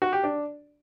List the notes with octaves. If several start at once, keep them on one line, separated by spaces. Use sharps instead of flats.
F#4
G4
D4